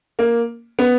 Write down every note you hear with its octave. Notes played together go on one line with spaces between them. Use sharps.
A#3
B3